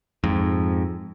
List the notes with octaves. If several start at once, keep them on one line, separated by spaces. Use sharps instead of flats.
F2 G#2